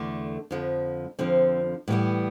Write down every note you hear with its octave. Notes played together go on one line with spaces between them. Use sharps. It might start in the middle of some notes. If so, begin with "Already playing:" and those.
Already playing: E2 D3 A3
F2 D3 F3
F2 D3 F3 C4
A2 E3 G3 B3